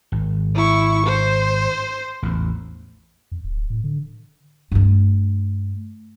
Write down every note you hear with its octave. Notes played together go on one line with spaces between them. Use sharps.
G#1
E4 C#6
C5
A1 E2
F2
D1
A2
D3
G2 A3